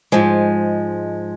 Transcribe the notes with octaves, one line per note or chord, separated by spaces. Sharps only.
G#2 F3 G#3